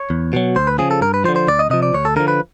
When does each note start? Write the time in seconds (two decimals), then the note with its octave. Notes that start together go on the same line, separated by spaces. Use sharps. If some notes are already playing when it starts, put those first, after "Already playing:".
Already playing: C#5
0.10 E2
0.33 B2 F#3
0.56 D2 C5
0.67 B4
0.78 C#3 F3 G#4
0.91 A4
1.01 G2 A#4
1.14 B4
1.24 F3 C5
1.29 D3
1.36 C5
1.48 D2 D5
1.59 D#5
1.70 C3 F3 D#5
1.83 D5
1.94 D2 C#5
2.05 A4
2.16 D3 F3 A#4
2.28 B4